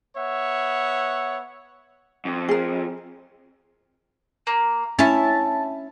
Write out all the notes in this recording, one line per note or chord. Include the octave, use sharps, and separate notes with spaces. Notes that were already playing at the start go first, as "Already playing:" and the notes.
B3 C#5 E5 F#5
F2
G#4 A#4
A#3
C#4 E4 A5